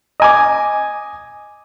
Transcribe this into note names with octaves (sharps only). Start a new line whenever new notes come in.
D#5 G#5 D6